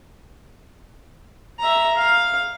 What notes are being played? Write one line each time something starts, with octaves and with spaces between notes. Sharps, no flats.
E5 A#5
F5